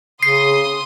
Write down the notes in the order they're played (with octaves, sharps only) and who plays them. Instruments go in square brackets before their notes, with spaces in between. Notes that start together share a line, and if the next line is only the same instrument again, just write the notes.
[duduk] C#3 [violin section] C6 D#6 [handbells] C7